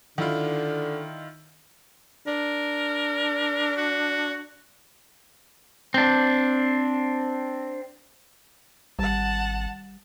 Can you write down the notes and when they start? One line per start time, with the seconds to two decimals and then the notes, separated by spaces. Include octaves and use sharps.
0.18 D3 D#3 E4 F4
2.27 D4 A#4
3.77 F#4
5.94 C4 D4
8.99 G#1 G3 F#5 A5